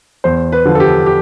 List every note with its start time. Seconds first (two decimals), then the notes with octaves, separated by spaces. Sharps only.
0.24 E2 C5
0.52 B4
0.65 D3 F3
0.75 A4
0.80 G4
1.06 G4